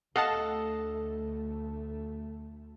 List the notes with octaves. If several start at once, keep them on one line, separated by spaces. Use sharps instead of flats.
D2 A3 A4 D#5 F5 F#5 A5